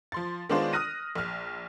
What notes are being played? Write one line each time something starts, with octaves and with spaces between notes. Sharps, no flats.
F3 C6 A6
D#3 G#3 B3 D4 F4 C5
D#6 F6 F#6 A#6 D#7
A#1 F6